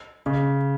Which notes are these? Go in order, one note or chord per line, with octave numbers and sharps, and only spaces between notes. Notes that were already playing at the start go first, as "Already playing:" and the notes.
C#3